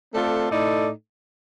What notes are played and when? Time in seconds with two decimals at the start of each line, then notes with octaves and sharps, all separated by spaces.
0.13 A3 C4 F4 A4 D5
0.51 A2 A3 D#4 A4 D5